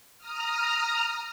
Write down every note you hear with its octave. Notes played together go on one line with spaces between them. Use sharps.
A#5 D#6 F6